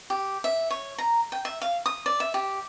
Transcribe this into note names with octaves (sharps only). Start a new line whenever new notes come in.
G4
E5
C#5
A#5
G5
E5
F5
D#6
D5
E5
G4